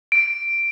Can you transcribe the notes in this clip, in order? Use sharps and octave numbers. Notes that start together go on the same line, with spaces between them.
D7